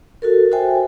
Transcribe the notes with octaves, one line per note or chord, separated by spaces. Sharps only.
F#4 A4 A#4
F#4 A4 C5 E5 G5 G#5